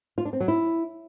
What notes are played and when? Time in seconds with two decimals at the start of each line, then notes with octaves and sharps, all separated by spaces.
0.18 F4
0.25 D4
0.33 C4
0.40 F#3
0.48 E4